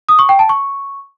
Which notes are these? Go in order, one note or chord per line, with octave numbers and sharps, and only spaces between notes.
D#6
C#6
G5
A5
C#6